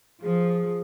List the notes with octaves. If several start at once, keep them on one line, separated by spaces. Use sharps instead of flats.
F3 G#4